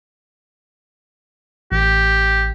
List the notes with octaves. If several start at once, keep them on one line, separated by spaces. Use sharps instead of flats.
A1 G4